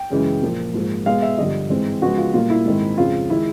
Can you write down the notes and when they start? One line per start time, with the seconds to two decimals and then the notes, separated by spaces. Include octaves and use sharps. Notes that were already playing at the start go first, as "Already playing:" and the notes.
Already playing: G5
0.10 F#2 C#3 E3 G#3
0.42 A#2 F3 A#3
0.74 G#2 F3 A#3
1.06 B2 G#3 B3 F5
1.22 E5
1.38 G2 D3 F3 D#5
1.70 G#2 E3 G#3 C4
2.02 C#3 F3 G#3 B3 F#4
2.18 F4
2.34 A#2 G3 A#3 F4
2.50 E4
2.66 G#2 D#3 G#3 C4
2.98 F2 C#3 F3 G#3 F4
3.30 D#3 G#3 E4